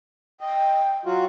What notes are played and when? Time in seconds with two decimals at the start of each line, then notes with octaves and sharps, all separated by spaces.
0.41 D#5 G5
1.06 F#3 F4 F#4